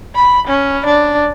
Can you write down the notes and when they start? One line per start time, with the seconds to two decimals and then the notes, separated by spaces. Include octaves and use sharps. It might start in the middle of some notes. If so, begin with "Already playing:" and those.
0.16 B5
0.47 C#4
0.86 D4